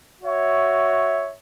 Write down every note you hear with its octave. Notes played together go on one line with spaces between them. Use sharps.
F#4 C#5 E5